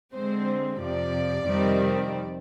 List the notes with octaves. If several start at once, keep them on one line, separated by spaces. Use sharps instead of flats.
D3 G#3 C4 C5
F2 C3 F3 D5
F2 C3 D#3 G3 C4